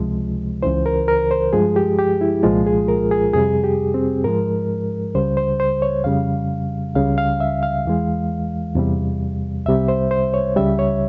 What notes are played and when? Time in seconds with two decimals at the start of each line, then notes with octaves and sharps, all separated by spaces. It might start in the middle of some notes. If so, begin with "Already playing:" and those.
Already playing: C#2 C3 F3 G#3
0.63 C#2 C#3 E3 C5
0.86 A#4
1.08 A#4
1.31 C5
1.53 G2 F3 G#3 G#4
1.76 G4
1.99 G4
2.21 E4
2.43 C2 A#2 F3 G#3 F4
2.66 G#4
2.88 A#4
3.11 G#4
3.34 F2 C3 G3 G#4
3.64 G4
3.94 C4
4.24 G#2 F3 G#3 A#4
5.15 C#2 C#3 G3 C5
5.37 C5
5.60 C5
5.82 C#5
6.04 F2 C#3 G3 F5
6.95 C#2 C#3 G3 F5
7.18 F5
7.40 E5
7.63 F5
7.85 E2 E3 G#3
8.76 E2 C3 G3
9.66 C2 C3 G3 E5
9.88 C5
10.11 C5
10.34 C#5
10.56 C#2 C#3 G3 E5
10.79 C#5